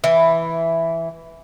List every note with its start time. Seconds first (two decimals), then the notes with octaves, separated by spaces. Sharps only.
0.04 E3